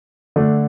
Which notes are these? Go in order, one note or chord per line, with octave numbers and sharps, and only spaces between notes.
D3 A3 D4